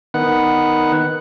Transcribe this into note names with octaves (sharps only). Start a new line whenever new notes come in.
D#3 B3 F#5